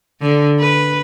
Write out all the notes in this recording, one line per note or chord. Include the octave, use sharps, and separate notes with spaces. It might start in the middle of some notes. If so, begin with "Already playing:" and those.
D3
B4